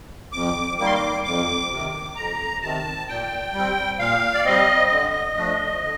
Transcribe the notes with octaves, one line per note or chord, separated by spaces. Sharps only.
F2 D6
D#3 G3 A#3 D6
C6
D6
F2 D6
C3 D#3
F2 A#5
C3 D#3 A5
A#2 G5
G3
C4
A#2 F5
D5
G3 C4 D#5
D3
F3 A3 D4
D3